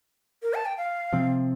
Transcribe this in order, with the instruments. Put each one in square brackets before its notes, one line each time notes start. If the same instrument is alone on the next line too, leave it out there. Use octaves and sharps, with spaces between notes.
[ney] A#4
A5
G5
F5
[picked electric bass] C3 F3 C4